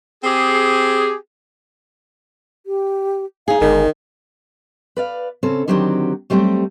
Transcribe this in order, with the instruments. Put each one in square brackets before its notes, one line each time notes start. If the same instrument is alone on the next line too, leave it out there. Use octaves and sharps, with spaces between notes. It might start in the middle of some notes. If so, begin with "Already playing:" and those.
[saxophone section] C4 G4 G#4
[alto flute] G4
[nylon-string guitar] D#4 G#4 [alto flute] F5
[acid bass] G1 [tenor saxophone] D#3 [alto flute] G#3
[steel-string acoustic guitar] B4 D5 F5
C#3 C4 C#4 A4
D3 D#3 F#3 C4 F#4 G4
F#3 G3 A3 C4 G4